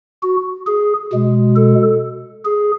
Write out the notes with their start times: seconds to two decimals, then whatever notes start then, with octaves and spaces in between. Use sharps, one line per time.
0.23 F#4
0.67 G#4
1.12 B2 G#3
1.56 A4
2.45 G#4